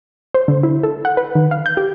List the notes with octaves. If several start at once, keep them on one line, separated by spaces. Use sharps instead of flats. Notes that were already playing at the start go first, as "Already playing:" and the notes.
C5
D3
E4
A4
F#5
B4
D#3
F5
G6
G4